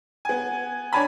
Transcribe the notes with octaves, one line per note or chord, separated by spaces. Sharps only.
B3 G#5
D4 C#5 G#5 A5 B5